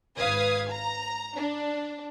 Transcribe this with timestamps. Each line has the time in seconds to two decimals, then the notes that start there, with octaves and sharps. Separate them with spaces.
0.16 G#1 B4 F5 D#6 G#6
0.69 A#5
1.35 D4